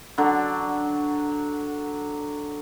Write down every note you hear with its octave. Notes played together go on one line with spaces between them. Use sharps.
D3 F#3 D4